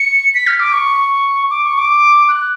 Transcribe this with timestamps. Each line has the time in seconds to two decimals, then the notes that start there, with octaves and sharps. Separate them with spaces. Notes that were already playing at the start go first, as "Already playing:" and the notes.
Already playing: C#7
0.34 B6
0.47 F6
0.60 D6
0.73 C#6
1.50 D6
1.64 C#6
1.78 D6
2.29 F#6